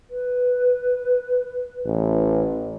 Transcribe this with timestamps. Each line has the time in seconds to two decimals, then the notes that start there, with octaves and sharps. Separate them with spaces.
0.10 B4
1.85 A1